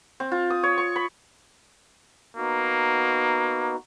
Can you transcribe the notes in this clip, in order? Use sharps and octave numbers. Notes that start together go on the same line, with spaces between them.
C4
F4
D#6
C#5
C#6
B5
A#3 B3 D#4 F#4